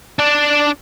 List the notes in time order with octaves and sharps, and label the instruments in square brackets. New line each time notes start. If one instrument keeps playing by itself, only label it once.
[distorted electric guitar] D4 D5